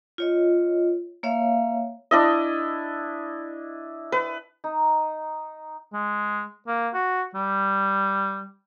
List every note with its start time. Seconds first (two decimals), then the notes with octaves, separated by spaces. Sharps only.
0.18 F4 C#5 D#5
1.23 A#3 C#5 E5 F5
2.11 D4 E4 D#5
4.12 B4
4.64 D#4
5.93 G#3
6.67 A#3
6.94 F#4
7.35 G3